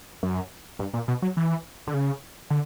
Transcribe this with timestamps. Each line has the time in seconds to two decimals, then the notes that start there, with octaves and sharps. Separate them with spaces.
0.23 F#2
0.79 G2
0.94 A#2
1.08 B2
1.22 F#3
1.37 E3
1.87 D3
1.94 C#3
2.50 D3